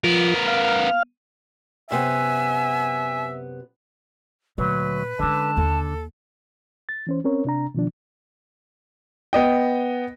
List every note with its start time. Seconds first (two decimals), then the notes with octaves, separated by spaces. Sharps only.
0.04 F3 B3 F4 A#4
0.48 F5 F6
1.91 F#2 C3 B3 E5 G#5
4.58 D2 A#2 F#3 B4
5.19 D3 G#3 C#4 A5
5.57 D#2 A4
6.89 A6
7.07 E3 C#4 C5
7.24 C4 C#4 A#4 C#5
7.45 C3 D4 A#5
7.74 B2 D#3 F3 D4
9.33 B3 D#5 G5